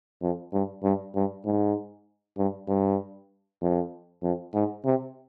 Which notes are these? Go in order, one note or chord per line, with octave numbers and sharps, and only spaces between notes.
F2
G2
G2
G2
G#2
G2
G2
F2
F2
G#2
C3